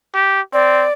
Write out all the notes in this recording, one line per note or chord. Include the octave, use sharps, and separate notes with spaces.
G4
C4 D5